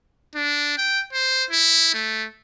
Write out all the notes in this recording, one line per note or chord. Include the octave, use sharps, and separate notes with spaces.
D4
G5
C5
E4
A3